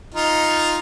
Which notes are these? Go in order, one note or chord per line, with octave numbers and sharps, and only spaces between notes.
D#4 F4